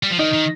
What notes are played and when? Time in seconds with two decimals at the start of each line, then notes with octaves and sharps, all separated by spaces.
0.03 G3
0.11 F3
0.19 D#3 D#4
0.33 D#3